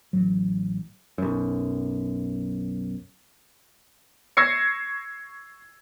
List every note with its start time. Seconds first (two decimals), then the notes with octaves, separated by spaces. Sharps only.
0.13 A1 F#3
1.18 B1 F#2
4.37 C#6 E6 G#6 A#6 C7 C#7